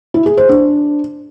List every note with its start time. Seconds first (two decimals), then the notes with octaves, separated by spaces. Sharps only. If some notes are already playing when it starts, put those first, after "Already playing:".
0.14 E4
0.26 G#4
0.37 C5
0.49 D4